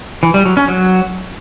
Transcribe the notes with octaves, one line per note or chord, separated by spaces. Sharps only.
E3
G3
F#3
C#4
F#3